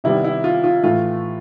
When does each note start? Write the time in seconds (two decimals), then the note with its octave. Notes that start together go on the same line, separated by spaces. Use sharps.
0.04 C3 D#3 G3 B3 E4
0.24 E4
0.44 F4
0.64 F4
0.83 A2 E3 A3 F4